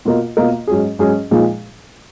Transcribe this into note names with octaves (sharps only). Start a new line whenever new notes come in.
B2 A#3 F4 A#4 D#5
B2 A#3 F4 A#4 D#5
G#2 F#3 C#4 G#4
G#2 F#3 C#4 G#4
A#2 F3 G#3 D#4 G#4